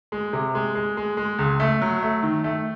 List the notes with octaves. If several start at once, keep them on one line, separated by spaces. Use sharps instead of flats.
G#3
C3
G#3
G#3
G#3
G#3
C#2
A3
F#3
A3
D#3
A3